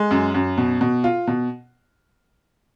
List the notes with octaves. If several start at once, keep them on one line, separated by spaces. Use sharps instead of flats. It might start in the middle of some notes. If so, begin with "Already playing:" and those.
Already playing: G#3
F#2
F#2
B2
B2
F4
B2